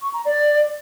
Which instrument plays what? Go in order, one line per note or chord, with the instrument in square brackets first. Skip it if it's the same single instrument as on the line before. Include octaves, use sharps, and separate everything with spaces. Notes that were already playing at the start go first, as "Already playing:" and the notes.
[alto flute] C#6
A#5
D5